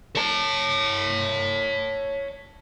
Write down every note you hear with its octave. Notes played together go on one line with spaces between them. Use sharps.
C#5 A5